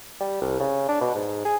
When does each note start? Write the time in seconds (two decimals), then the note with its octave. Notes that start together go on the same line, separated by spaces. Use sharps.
0.20 G3
0.42 C2
0.60 C#3
0.89 D4
1.01 B2
1.15 G#2
1.45 G#4